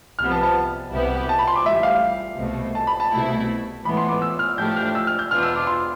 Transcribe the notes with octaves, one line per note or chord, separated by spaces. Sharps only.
C2 C3 F3 B3 F6
A5
A5
C2 B2 B3 E4 G4
A5
B5
C6
D6
A1 A2 G3 E5
F5
C2 B2 A3
A5
B5
A5
C2 B2 A3 E4
A2 E3 B3 B5
C6
D6
E6
F6
A2 F3 A3 D4 G4 G6
F6
E6
F6
G6
E2 B2 B3 D4 F4 F6
E6
D6
C6